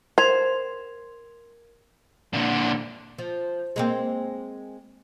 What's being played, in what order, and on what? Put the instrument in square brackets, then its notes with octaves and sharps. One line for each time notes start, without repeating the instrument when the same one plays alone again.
[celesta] A#4 G#6 F7 [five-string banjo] C5
[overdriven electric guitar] A#2 D3
[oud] F3
G#3 A#3 C4